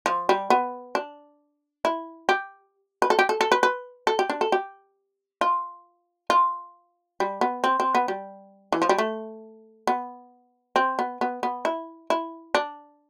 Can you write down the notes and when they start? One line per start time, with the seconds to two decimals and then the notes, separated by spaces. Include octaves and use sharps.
0.06 F3
0.29 G3
0.50 B3
0.95 D4
1.85 E4
2.29 G4
3.02 B4
3.10 A4
3.19 G4
3.29 A4
3.41 A4
3.52 B4
3.63 B4
4.07 A4
4.19 G4
4.30 D4
4.41 A4
4.52 G4
5.41 F4
6.30 F4
7.20 G3
7.41 B3
7.64 C4
7.80 C4
7.95 B3
8.08 G3
8.72 E3
8.82 F3
8.89 G3
8.98 A3
9.87 B3
10.76 C4
10.99 B3
11.21 B3
11.43 B3
11.65 E4
12.10 E4
12.55 D4